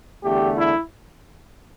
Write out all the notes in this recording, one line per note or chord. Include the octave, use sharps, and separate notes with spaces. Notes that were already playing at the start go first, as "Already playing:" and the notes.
E2 D3 A3 G4
E4